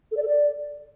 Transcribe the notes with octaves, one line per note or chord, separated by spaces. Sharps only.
A4
D5
A4
D5